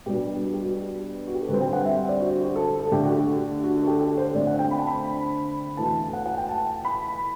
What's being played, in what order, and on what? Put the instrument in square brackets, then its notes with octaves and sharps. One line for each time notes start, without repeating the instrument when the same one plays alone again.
[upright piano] B2 G3 B3 D4 G4
F#4
G4
F#4
G4
F#4
G4
A4
D3 G3 C4 B4
G5
F#5
E5
D5
F#4
F#4
G4
A4
A4
D3 A3 D4 G4
F#4
G4
F#4
F#4
A4
G4
A4
C5
D3 A3 C4 D5
F#5
G5
B5
A5
B5
E2 B2 A3 A5
F#5
F#5
G5
A5
B5